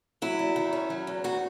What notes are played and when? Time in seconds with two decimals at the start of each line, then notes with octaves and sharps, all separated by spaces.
0.22 F#3 E4
0.39 E2
0.56 D#3
0.73 C#4
0.90 F#3
1.07 E2
1.24 D#3 F#4